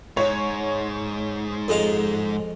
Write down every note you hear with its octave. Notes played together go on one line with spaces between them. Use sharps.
G#2 C#5
F2 G#3 F5